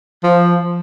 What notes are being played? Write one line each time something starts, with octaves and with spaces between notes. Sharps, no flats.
F3